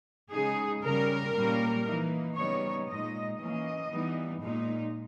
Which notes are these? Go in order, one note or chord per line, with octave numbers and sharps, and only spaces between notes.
C#3 G#3 D#4 G#4
C#3 G3 C#4 A#4
A#2 G3 A#3 C#4
E3 A#3 D#4
C#3 G3 B3 D#4 C#5
A#2 G#3 D#4 D#5
E3 A#3 C#4 D#5
E3 G3 B3 D#4
A#2 G#3 D#4